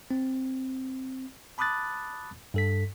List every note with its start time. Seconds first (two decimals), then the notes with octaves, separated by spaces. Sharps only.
0.11 C4
1.58 A5 B5 D6 D#6 F#6 A6
2.54 G2 A4 B6